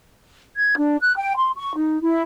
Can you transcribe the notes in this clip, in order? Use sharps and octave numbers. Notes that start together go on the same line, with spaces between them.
G#6
D4
F#6
G5
C6
C#6
D#4
E4